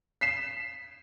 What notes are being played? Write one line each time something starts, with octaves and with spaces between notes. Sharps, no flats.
B6 C7 E7